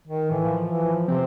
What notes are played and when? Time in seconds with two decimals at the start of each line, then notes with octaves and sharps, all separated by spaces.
0.08 D#3
0.31 A2 E3
0.45 F3
0.67 E3
1.08 C3 C4